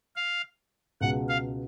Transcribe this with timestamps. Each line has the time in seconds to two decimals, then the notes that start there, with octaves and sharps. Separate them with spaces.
0.16 F5
1.01 C#2 B2 G#3 F#5
1.29 F5